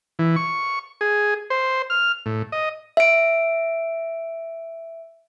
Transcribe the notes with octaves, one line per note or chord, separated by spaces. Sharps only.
E3
C#6
G#4
C5
F6
A2
D#5
E5 D7